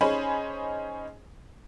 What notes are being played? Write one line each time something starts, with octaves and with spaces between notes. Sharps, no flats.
C#4 D#4 G#4 C5 G#5 B5